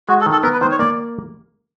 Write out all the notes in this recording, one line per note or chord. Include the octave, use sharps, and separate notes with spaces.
G#3 F#4
A4
D#3
A4
B3 A#4
B4
D#3 C5
C#5
A#3 D5